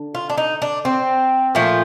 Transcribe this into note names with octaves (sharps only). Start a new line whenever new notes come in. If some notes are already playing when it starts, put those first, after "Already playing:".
Already playing: D3
F4
D4
D#4
D4
C4
A#2 F3 A3